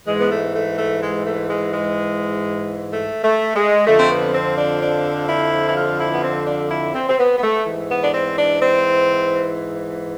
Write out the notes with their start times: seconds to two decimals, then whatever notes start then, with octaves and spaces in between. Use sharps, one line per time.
0.07 G#2 E3 G#3
0.20 B3
0.30 A3
0.55 A3
0.78 A3
1.02 G#3
1.25 A3
1.49 G#3
1.74 G#3
2.92 A3
3.24 A3
3.55 G#3
3.86 F2 D3 F3 A3
3.99 C4
4.11 B3
4.34 C4
4.58 D4
4.82 D4
5.29 E4
5.69 E4
5.76 F4
6.00 E4
6.13 B3
6.24 C4
6.47 D4
6.71 E4
6.95 C4
7.09 C4
7.19 B3
7.38 B3
7.43 A3
7.66 G#2 E3
7.90 B3
8.04 D4
8.14 C4
8.38 D4
8.62 C4